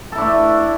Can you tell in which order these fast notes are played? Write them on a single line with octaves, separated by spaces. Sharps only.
A4 E4 D4 A3